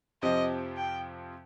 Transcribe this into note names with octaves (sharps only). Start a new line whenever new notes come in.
F2 C3 F3 C4 G4 D#5
G5